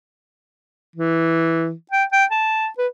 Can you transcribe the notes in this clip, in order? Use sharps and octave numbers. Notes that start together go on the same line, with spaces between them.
E3
G5
G5
A5
B4